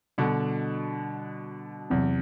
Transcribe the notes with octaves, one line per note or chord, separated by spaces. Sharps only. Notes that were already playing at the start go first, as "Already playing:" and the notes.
B2 D3 G3 D4 F#4
E2 C3 F#3 C4